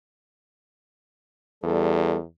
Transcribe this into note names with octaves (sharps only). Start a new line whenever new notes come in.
E2 G3 A4